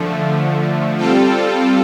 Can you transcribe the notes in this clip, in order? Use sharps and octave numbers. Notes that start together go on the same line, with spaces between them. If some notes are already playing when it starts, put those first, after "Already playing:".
Already playing: D3 F3 A3
G3 C4 F4 A4